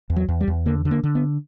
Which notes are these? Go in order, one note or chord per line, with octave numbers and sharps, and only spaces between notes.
E2
F#3
E2
G3
E2
D3 A#3
D3
A#3
D3
B3